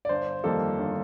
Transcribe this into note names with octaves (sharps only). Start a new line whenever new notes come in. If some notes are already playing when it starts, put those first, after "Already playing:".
D5
G1 C5
F2 D#3 G3 A#3 A4
G1